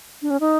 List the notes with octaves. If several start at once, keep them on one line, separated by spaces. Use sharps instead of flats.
D4
C#4
D#4